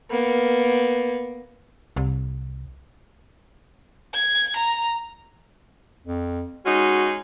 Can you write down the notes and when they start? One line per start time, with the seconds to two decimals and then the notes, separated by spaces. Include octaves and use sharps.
0.11 A#3 B3
1.96 C2
4.14 G#6
4.56 A#5
6.06 F2
6.66 G#3 C#4 D#4 F#4